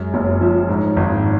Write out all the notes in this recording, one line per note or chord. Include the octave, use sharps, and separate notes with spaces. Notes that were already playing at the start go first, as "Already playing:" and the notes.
Already playing: F#2 G#3
F#1
F3
G#2
G#1